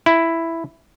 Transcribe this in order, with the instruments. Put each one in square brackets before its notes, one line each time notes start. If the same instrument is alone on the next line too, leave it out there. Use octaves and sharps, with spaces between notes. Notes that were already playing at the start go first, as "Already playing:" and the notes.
[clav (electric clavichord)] E4